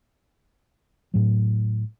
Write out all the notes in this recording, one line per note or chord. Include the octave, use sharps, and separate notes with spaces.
A2 F#3